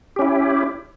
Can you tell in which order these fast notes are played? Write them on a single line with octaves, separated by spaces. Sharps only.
G4 C#4 E4